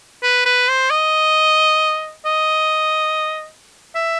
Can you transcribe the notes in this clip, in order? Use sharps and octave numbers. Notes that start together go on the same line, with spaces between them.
B4
B4
C5
D#5
D#5
E5